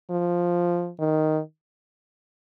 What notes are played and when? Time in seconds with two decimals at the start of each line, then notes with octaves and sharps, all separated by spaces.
0.10 F3
1.00 D#3